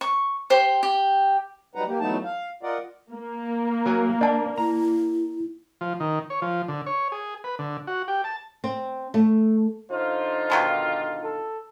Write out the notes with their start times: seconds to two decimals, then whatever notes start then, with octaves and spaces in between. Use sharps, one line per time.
0.01 C#6
0.50 G4 C5
0.83 G4
1.75 F#3 G3 D#4 B4 F#5 A#5
1.88 A#3 G4
2.00 E2 F#3 A3 B3 D#4 A5
2.24 F5
2.63 F4 A#4 D5 D#5 F#5
3.12 A#3
3.86 F#3 A#4 G#5
4.21 D4 D5 A5
4.58 E4 A#5
5.81 F3
6.00 D#3
6.30 C#5
6.42 F3
6.68 D3
6.86 C#5
7.12 G#4
7.44 B4
7.59 D3
7.87 F#4
8.08 G4
8.24 A5
8.64 C4
9.14 A3
9.91 D3 D#4 F4 C5
10.50 B2 D#3 F3
11.23 A4